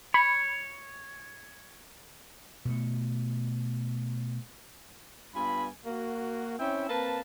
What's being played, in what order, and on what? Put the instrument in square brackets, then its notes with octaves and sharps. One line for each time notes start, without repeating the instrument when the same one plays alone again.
[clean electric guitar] C#5 [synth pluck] B5
[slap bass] B2 A3
[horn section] G2 B3 F4 G#5 B5
A#3 F#4
C4 C#4 E4 C#5 E5 G5
A#3 C4 B4 A5